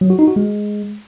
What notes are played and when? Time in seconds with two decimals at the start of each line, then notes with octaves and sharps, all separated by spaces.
0.01 F#3
0.10 F#4
0.19 D#4
0.27 F#4
0.36 G#3